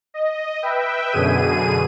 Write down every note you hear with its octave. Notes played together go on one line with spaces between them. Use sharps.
D#5
B4 E5 G5
F#2 B2 D3 G#4 D#7